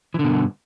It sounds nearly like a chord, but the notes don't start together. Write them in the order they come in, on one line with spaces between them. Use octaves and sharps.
E3 D3 B2 G2